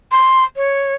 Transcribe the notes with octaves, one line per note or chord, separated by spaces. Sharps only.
C6
C#5